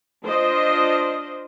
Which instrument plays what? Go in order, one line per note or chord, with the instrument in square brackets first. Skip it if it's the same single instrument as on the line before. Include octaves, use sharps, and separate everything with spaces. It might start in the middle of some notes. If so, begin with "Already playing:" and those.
[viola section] D4 F4 C5 D#5